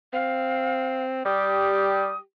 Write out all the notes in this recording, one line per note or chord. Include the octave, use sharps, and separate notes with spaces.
C4 F5
G3 G4 D#6